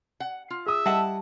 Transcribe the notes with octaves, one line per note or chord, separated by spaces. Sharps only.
F#5
F4
G#4 E5 D#6
G3 E4 D#5 F#5 A5